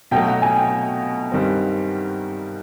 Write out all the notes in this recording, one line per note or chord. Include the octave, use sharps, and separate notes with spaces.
B2 F#3 A3 G5
F#5
G#5
G5
G2 D#3 G3 C4